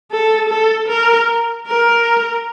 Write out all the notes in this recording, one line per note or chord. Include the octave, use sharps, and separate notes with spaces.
A4
A4
A#4
A#4